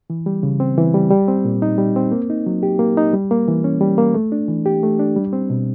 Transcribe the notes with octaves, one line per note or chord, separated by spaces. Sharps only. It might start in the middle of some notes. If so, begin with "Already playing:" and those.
E3
G3
C#3
C4
E3
G3
G3
C4
A#2
D#4
G3
C4
A#3
D#4
F#3
G4
A#3
D#4
G3
A#3
E3
C#4
G3
A#3
A3
D4
E3
G4
A3
D4
G3
C4
B2